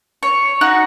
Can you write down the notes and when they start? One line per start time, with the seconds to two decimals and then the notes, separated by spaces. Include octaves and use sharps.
0.23 C#5
0.61 D#4 F#4 F#6